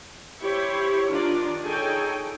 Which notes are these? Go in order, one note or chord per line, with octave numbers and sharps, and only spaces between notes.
E4 G4 C5 C#5
D#3 D4 F4 A#4 D5
D#4 G#4 A4 C#5 G5 G#5